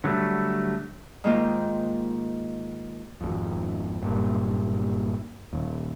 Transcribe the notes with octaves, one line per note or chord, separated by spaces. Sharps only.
D3 F#3 G3 A3
G#2 D#3 G#3 A#3 C4 F4
G#1 F2
F#1 G2 A#2
D#1 D#2